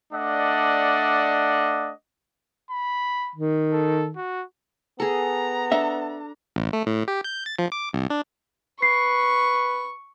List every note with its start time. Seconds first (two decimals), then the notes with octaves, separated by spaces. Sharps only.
0.14 A3 D4 D5 D#5 F#5
2.71 B5
3.35 D#3
3.73 A4
4.16 F#4
5.00 B3 G#4 A4 A#5
5.72 D4 A4 E5
6.56 A1
6.73 A3
6.86 A2
7.08 G4
7.24 G6
7.46 A6
7.59 F3
7.72 D6
7.93 C2
8.10 D4
8.82 B4 C#6 C7